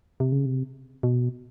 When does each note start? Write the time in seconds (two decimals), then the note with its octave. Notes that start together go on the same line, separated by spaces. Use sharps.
0.20 C3
0.32 C#3
0.46 C3
1.03 B2